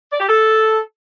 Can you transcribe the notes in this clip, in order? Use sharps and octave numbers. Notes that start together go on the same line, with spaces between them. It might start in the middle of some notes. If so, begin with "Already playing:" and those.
D5
G4
A4